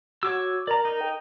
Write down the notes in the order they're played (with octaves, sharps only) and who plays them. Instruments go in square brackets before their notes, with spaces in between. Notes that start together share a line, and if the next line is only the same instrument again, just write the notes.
[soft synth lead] F#4 [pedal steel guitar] C#5 D6 E6
[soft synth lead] A#4 [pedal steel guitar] D5 A#5
[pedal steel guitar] D#4
[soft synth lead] G5